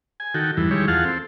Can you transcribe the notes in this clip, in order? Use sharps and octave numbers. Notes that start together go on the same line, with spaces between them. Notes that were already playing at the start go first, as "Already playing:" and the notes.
G#5
D#3 F#4 A4 G5
E2 G2 E3
D#3 G3 G#3 E4 C#5
E2 F4 G#4 F5 F#5 A5
C4 A4